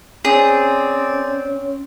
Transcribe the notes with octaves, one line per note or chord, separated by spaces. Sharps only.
C4 C#4 G#4 D5